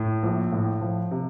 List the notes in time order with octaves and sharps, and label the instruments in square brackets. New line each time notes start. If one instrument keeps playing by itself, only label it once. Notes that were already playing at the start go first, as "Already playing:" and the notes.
Already playing: [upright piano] A2
A#1
A2
F3
C3